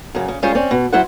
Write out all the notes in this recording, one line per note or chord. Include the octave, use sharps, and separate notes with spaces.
F#2 C#3
C#3
G3 G#3 C#4 F4 C5
C4 C#4 D5
B2
F#3 E4 C5 F#5